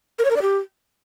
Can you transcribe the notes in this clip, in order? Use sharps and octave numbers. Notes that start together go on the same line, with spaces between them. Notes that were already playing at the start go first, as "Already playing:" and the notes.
A#4
C#5
A#4
D5
G4